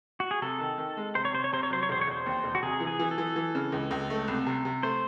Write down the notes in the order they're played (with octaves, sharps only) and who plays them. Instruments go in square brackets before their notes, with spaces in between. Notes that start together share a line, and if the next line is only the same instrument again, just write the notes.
[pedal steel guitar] F#4
G#4
[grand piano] C3 [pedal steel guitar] A4
[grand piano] D#3
D#3
G#3
[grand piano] C3 [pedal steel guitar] C5
[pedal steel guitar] C#5
[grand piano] C3 [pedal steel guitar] C5
[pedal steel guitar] C#5
[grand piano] C3 [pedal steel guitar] C5
[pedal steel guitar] C#5
[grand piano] F#3 [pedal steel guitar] C5
[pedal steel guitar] C#5
[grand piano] E1 [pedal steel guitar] C5
[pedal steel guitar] C#5
[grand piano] E1 [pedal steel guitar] C5
[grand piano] D#2
E1
[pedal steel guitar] F#4
[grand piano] C3 [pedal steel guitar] G#4
[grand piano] E3
[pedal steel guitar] G#4
[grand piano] E3
[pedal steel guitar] A4
[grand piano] E3
E3
C#3
C#2
C#2
A3
C2
C3
C3
[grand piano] A3 [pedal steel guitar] C5